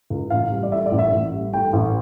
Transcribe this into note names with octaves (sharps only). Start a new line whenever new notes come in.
C#2
A1 F5
G3
D5
A2 E5
D5
A1
E5
A1
G3
A2 G5
A1